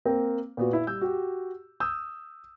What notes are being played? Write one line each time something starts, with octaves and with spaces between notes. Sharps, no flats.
A#3 C4 A#4 G5
A#2 B3 F#4
E4
G3 E6 G6
F#4 G4
D#6 E6 G6